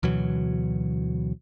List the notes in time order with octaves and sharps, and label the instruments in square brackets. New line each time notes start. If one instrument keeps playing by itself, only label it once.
[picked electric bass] D2 B2 E3 F#3